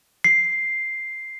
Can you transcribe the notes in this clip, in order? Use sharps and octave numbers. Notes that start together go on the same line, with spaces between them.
C7